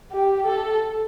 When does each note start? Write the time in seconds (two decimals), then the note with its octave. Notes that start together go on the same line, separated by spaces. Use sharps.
0.12 G4
0.46 A4